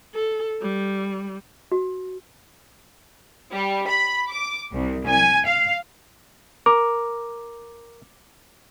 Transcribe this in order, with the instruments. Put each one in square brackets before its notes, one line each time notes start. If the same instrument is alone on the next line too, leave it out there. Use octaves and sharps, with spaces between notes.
[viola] A4
G3
[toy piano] F#4
[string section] G3
B5
D6
C2
G#5
F5
[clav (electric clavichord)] A#4 [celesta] D6